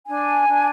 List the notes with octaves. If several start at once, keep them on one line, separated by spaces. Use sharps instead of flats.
D4 G#5
D4